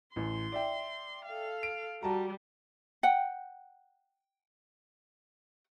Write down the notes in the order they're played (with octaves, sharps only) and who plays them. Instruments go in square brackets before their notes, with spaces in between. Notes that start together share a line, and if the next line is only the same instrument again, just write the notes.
[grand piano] A1 [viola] C6
[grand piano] D5 E5 G5
[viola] A4 F5
[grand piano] D7
[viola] G3 [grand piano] F#4 A5 A#5
[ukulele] F#5 G5